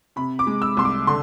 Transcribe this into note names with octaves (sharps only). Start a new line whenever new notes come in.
C3 B5
D6
G#3
E6
C2 C6
D6
D3 C6